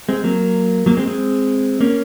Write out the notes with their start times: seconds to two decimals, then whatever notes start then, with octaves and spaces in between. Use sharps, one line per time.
0.09 G#3 C4
0.24 F#3 A#3
0.86 F#3 A#3
0.97 G#3 C4
1.07 G#3 C4
1.81 A#3 C#4